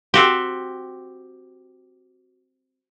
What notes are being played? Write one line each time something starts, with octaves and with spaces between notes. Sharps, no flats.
C4 F#4 G4